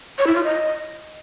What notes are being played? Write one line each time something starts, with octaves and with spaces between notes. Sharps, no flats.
C#5
E4
F4
D#5